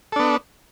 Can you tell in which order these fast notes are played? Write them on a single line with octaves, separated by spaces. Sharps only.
A4 D4 B3